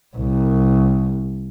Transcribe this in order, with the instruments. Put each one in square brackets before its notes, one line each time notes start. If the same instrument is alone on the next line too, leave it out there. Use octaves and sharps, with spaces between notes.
[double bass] C2